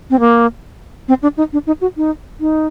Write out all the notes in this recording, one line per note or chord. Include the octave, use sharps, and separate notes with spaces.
C4
A#3
C4
D4
D#4
D4
D#4
F#4
D#4
D#4